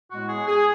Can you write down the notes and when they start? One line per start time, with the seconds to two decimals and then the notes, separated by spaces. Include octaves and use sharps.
0.11 A2 G#3 B3 F#4
0.29 G#4
0.47 G#4